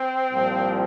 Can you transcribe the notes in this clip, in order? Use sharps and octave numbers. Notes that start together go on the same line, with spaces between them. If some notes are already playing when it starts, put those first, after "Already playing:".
Already playing: C4
C2 A#2 F3